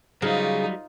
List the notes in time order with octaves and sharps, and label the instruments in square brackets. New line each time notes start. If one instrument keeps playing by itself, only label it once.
[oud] C#3 [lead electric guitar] F#3 G3 [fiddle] D#4 F4